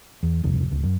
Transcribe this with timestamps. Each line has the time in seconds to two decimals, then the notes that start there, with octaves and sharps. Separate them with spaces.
0.23 E2
0.43 D#1 C2 F2 C3
0.71 D1 C#2
0.83 F#2